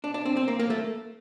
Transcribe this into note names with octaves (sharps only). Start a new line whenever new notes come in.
D4
D4
C4
C4
A#3
A#3
A3